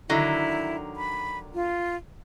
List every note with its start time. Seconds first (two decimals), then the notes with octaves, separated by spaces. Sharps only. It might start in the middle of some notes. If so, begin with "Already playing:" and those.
0.09 D3 D#3 F#3 E4
0.96 B5
1.54 F4